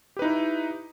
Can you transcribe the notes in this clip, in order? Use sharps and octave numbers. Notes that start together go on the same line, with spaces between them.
D#4 E4 G4 B4